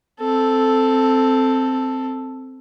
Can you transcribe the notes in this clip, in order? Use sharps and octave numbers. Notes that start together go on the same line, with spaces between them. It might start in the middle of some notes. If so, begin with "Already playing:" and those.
C4 A4